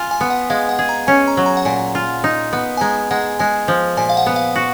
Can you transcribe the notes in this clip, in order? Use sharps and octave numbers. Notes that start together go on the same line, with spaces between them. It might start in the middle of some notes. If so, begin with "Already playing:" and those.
Already playing: F4 G#5
G#5
B3
F#5
G#3 F5
F#5
G#4
A#5
C#4 G#5
A#5
F#3
A#5
F#5
A#2 G#5
F4
D#4
B3
G#5
G#3 A#5
G#3 F#5
G#3 G#5
F3
A#2 G#5
F5
F#5
B3
F5
F#4